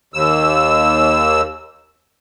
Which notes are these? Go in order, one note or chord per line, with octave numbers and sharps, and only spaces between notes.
D#2 E6